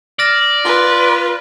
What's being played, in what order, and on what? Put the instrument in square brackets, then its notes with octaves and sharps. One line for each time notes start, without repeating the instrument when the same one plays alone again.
[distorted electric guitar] D5 [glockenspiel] F6 A#6 E7
[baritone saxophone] F4 [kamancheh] B4 [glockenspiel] G7